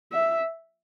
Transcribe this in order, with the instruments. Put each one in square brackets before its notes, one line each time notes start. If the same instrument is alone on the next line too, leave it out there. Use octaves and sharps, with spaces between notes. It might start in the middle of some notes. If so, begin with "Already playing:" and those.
[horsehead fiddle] E5